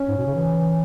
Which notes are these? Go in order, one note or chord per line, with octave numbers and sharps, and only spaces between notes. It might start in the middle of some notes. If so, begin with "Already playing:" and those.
Already playing: C#4
G#2
B2
C#3
E3